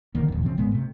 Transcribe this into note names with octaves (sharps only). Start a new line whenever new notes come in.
F1 D3 D#3 A#3
D#1 F2
C#3 F3 C4
G#1 A2 G#3 B3
C3 A3